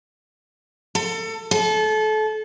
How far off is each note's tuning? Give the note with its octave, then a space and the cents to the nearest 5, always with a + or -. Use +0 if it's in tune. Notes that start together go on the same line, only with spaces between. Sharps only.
A4 +30
A4 -30